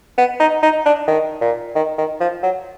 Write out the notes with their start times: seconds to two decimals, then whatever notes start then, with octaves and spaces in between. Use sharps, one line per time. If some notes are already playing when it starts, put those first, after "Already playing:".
0.18 B3
0.40 D#4
0.62 D#4
0.86 D4
1.08 D#3
1.41 A#2
1.75 D#3
1.98 D#3
2.20 F3
2.43 F#3